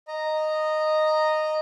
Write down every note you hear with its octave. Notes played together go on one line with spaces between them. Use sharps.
D#5 A#5